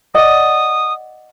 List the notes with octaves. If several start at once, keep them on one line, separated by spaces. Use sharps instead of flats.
D5 D#5 F#5 D#6